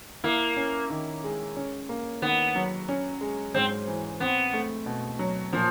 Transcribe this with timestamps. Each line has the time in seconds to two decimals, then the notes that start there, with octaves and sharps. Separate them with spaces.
0.24 A#3 E4
0.57 C#4
0.90 D#3
1.24 G#3
1.56 C#4
1.89 A#3
2.22 D#3 B3
2.56 F#3
2.89 C#4
3.21 G#3
3.54 G#2 C4
3.88 E3
4.20 B3 C4
4.53 A3
4.86 B2
5.19 F#3
5.53 A#2 F3